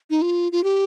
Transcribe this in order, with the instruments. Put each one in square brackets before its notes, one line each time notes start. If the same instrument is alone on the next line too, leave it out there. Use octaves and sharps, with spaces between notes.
[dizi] D#4
F4
F4
G4